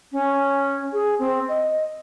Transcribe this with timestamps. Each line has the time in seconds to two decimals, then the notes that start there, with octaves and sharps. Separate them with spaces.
0.12 C#4
0.93 G#4
1.19 C4
1.48 D#5